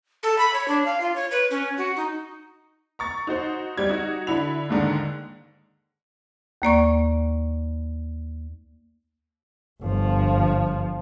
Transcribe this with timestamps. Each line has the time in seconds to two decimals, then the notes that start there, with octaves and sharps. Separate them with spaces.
0.23 A4
0.38 B5
0.53 C#5
0.68 D4
0.85 F5
1.01 F4
1.15 C#5
1.31 B4
1.50 C#4
1.77 F#4
1.96 D#4
2.99 A#5 C#6 A6
3.27 D#4 F#4 C5
3.78 G3 G4 G#6
3.89 D#4 F#4
4.27 D3 E4 B5 F7
4.69 D#2 G#2 D3 D#3
6.62 D#2 A#3 D5 C#6
9.82 G1 F3